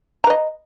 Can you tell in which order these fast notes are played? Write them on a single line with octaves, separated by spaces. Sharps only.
A#5 B4 D#5